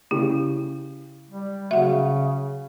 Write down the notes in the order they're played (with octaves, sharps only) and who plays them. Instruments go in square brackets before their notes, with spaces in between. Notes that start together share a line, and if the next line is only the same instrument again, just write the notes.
[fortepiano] C#3 G4 [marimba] E4
[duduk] G3
[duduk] C#3 [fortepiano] F#3 [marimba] E5 F#5